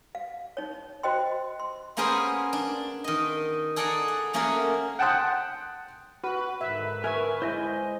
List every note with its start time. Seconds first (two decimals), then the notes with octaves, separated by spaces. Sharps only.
0.15 F5
0.57 D#4 C#5
1.03 F#4 C5 D#5 G5 C6
1.60 C6
1.97 A#3 B3 C#4 G#4 A#4 C5
2.53 D4
3.04 D#3 D#5
3.76 G#4 A4 D5 F#5 G#5 A#5
4.08 F#5
4.33 A3 A#3 C#4 F#4 G#4 A#4
4.99 F#5 G5 A5 C6 D#6 F#6
6.24 F#4 B4
6.61 G#2 D3 D#3 E5
7.04 A#4 E5 G#5 C#6
7.42 G#3 E4 C5 D#5 G#5